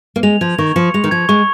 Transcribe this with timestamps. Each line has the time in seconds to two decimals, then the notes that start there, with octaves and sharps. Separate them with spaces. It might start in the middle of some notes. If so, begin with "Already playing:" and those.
0.16 A#3
0.23 G#3 F7
0.41 F3 G#6
0.58 D#3 C#6
0.76 F3 C#7
0.94 G#3 F7
1.04 D#3
1.11 F3 G#6
1.29 G#3 C#6